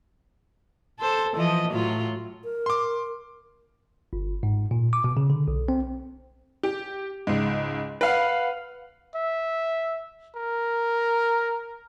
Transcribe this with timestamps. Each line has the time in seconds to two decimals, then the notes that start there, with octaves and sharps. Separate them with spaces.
1.00 A4 C5
1.35 E3 F3 D#5
1.71 A2 F#3 F4
2.44 A#4
2.66 C6 D6
4.13 G1
4.43 G#2
4.71 A#2
4.93 D6
5.04 B2
5.17 C#3
5.30 D3
5.48 B1
5.68 C4
6.63 G4
7.27 C#2 G#2
8.01 B4 F5 F#5
9.15 E5
10.36 A#4